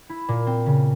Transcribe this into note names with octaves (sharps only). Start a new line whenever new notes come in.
E4
A#2
C4
C#3